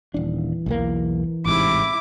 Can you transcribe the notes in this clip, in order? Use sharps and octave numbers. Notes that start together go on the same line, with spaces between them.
D#1 E3 D4
B1 E2 A#3
A1 G#2 C3 E4 D6